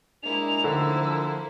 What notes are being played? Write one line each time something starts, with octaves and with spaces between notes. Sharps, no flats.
G#3 A#3 D4 E4 F7
A2 D3 D#3 F3 E6
F3